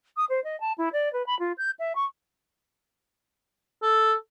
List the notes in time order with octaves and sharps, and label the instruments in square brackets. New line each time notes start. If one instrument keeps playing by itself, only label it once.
[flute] D#6
C5
D#5
A5
E4
D5
B4
B5
F4
G6
E5
C#6
[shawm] A4